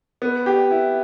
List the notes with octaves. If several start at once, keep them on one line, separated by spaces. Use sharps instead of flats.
B3
G4
E4